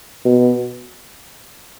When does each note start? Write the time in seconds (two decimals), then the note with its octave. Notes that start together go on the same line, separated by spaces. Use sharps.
0.25 B2